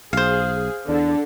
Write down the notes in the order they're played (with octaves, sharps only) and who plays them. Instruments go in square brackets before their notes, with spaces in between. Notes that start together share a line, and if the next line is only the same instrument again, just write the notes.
[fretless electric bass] B1 [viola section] G#4 [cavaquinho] C5 F5
[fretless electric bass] E2 [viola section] D3 [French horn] D4